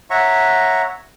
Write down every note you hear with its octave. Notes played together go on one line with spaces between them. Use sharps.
C#5 E5 F#5 A#5 C#6